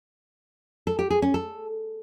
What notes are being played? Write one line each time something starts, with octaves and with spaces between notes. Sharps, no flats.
A4
G4
G#4
C#4
A4